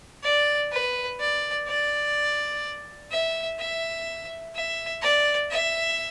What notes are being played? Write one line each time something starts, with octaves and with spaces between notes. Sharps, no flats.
D5
B4
D5
D5
E5
E5
E5
D5
E5